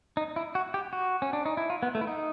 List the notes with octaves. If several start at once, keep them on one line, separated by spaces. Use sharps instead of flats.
D#4
E4
F#4
G4
F#4
C#4
D4
D#4
E4
F4
B3
A3
E4
D#4